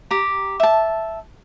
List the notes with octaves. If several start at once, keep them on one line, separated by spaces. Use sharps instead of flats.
G4 A#5
E5 A5